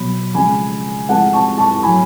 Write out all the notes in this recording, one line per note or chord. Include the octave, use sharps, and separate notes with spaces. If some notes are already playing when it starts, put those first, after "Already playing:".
Already playing: B2 F#3 B5
C#3 F3 G#3 G#5 B5
A2 F3 G#3 F#5 A5
A5 C#6
A5 C#6
A5
A2 F#3 G#5 B5